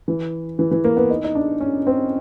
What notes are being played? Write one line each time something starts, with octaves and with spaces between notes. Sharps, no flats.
E3
E3
E3
A#3
B3
D#4
D#4
D4
C#4
C4